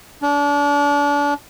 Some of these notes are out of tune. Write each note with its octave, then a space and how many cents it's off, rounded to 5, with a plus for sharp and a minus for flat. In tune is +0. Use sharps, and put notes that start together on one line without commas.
D4 -30